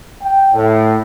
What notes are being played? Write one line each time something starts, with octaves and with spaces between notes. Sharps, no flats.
G5
A2